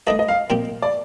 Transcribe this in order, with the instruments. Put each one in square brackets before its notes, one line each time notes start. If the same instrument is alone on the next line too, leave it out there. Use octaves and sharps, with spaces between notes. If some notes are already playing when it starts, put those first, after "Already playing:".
[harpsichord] A3 D4 A4 D5 [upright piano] D#5
[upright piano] D#5
F5
[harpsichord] A#2 F3 C4 G4
[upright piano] D5